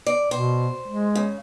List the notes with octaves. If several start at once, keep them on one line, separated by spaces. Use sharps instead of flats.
D5
B2 C5
G#3
C#3